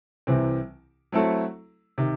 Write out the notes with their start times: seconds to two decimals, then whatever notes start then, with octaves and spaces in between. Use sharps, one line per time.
0.27 C2 C3 E3 C4
1.12 F#3 A3 C4 E4 A4
1.98 C3 D#3